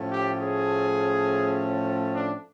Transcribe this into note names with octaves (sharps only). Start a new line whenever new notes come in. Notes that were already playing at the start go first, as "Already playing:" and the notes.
Already playing: A2 F3 A3 C#4
G4
G#4
D4